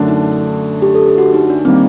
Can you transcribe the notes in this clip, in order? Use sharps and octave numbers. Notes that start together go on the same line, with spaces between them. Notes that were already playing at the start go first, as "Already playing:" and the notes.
Already playing: F#2 D3 A3 D4
D#4
G4
A4
G4
F#4
D#4
D4
D#3 G3 A#3 C4